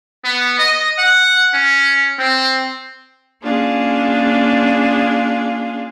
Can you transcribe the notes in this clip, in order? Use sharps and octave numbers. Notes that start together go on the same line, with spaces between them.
B3
D#5
F#5
C#4
C4
A#3 C#4 D4 F4 G#4